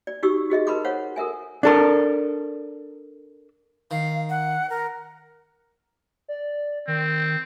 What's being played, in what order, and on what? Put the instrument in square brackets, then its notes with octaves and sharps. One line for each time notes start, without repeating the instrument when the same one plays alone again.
[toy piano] D5
D#4 F#4 G4 C#6 E6
F#4 G#4 D#5 E5
A#4 B4 A5 B5 C6 D6
C5 C#5 F5 F#5
A4 A#4 E5 G#5
[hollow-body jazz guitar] D4 A4 A#4
[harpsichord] D#3 [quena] F5
[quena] F#5
A#4
[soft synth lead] D5
[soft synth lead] D#3 [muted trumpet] C4